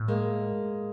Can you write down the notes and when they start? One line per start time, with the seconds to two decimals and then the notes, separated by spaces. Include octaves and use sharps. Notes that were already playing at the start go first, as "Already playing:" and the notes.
Already playing: A2
0.08 G#3 A#3